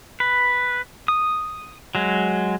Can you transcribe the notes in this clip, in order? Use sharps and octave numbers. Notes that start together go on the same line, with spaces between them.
B4
D#6
F#3 G#3